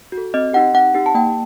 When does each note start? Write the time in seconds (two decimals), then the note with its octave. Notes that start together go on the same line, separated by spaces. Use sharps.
0.12 F#4
0.17 A4
0.34 C4 D#5
0.53 D#4 G4 F#5
0.74 C4 F#5
0.95 D#4 G4
1.06 A5
1.15 A#3 G5